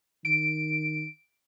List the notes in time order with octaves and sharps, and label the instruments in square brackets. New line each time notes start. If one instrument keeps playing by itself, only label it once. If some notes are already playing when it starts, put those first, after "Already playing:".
[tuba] D#3 [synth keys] D7